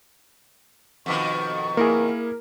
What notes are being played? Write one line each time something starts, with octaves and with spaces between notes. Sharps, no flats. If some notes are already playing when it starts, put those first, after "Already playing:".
F2 B2 D#3 C#6
A#3 E4 G#4 A#4